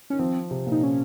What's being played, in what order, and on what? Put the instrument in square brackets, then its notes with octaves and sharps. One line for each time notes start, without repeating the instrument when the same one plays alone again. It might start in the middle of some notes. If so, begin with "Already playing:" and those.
[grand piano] D#3 [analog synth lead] C#4
[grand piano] F3 [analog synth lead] C4
[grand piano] C3
A#2
[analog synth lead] D#4
C#4